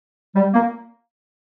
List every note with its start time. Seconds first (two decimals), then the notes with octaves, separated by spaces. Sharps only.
0.35 G3
0.54 A#3